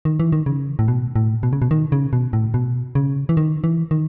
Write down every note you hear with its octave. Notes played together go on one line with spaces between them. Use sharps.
D#3
E3
D#3
C#3
A2
B2
A2
B2
C#3
B2
D#3
C#3
B2
A2
B2
C#3
E3
D#3
E3
D#3